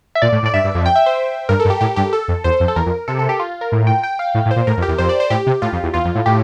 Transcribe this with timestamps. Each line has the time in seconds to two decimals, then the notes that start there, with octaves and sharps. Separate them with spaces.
0.15 E5
0.22 A#2 D5
0.32 A2
0.43 A2
0.46 D5
0.54 G2 E5
0.64 G2
0.75 F2
0.86 G5
0.96 E5
1.06 C5
1.49 G2 A#4
1.60 A4
1.65 G2
1.70 G4
1.81 A2 G4
1.96 G2 G4
2.13 A4
2.28 F2
2.44 E2 C5
2.60 F2
2.68 A4
2.76 E2 A#4
2.86 F2
3.08 C3 A4
3.19 A4
3.29 G4
3.40 F4
3.61 A#4
3.72 A2
3.87 G5
4.03 G5
4.19 F5
4.35 A2
4.46 A2
4.51 C5
4.56 A#2
4.67 A2 A#4
4.78 F2
4.82 G4
4.88 E2
4.98 F2 C5
5.09 D5
5.20 C5
5.30 A2 G4
5.46 C3
5.62 A2 F4
5.73 F2
5.83 E2
5.94 E2 F4
6.05 F2
6.15 A2
6.26 A2 G4